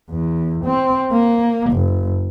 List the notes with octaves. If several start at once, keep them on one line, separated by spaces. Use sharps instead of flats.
E2
C4
A#3
F#1